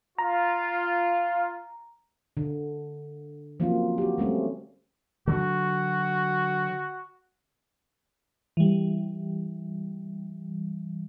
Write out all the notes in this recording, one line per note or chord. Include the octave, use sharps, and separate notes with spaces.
F4 A#5
D3
F3 F#3 A#3 C4 C#4 F4
F#4 G4
G3 A3 C4 C#4
D3 F#3 F#4
E3 G3